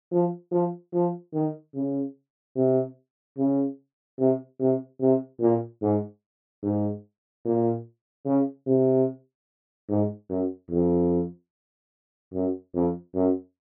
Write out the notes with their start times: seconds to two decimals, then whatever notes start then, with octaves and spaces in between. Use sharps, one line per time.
0.12 F3
0.52 F3
0.93 F3
1.34 D#3
1.74 C#3
2.56 C3
3.37 C#3
4.19 C3
4.60 C3
5.00 C3
5.40 A#2
5.82 G#2
6.63 G#2
7.45 A#2
8.26 C#3
8.67 C3
9.89 G#2
10.30 F#2
10.70 F2
12.33 F#2
12.74 F2
13.15 F#2